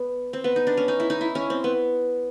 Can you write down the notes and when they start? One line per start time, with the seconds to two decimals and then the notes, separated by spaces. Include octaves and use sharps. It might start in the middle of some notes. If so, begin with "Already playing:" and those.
Already playing: B3
0.33 C4
0.44 B3
0.56 D#4
0.67 D4
0.77 C#4
0.88 D#4
1.00 E4
1.10 D#4
1.21 E4
1.35 C#4
1.50 C4
1.64 B3